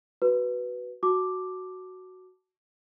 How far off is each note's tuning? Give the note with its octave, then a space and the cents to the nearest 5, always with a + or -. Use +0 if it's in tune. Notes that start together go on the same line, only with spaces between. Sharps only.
F#4 +10 B4 +0
F#4 +0 A5 +0 D6 +0